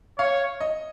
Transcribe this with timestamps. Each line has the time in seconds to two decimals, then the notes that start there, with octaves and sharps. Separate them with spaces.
0.18 C#5 F5
0.61 D#5